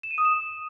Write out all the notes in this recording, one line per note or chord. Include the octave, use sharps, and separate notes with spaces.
E7
D#7
D#6
E7